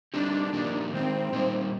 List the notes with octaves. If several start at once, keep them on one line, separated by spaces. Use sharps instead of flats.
G3 C4 D4 D#4 G4
A#2 F3 A#3 D#4 G4
D#3 G#3 C4 D#4
A#2 G3 A#3 D#4